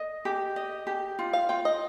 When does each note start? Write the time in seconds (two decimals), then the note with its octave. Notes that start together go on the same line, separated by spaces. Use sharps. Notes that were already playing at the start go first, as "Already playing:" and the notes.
Already playing: D#5
0.25 G4
0.56 D#5
0.87 G4
1.19 F4
1.33 F5
1.49 F4 G5
1.65 D#5